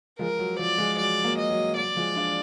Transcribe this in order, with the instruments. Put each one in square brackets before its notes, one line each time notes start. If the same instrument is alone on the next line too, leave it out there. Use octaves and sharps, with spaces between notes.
[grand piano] F3 G#3 [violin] A#4
[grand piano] F#3
[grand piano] F3 [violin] D5
[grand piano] F3 G#3
[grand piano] F#3 [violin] D5
[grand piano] F#3 A#3
[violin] D#5
[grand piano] F#3
[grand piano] F#3 [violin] D5
[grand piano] F3 G#3
D4 F4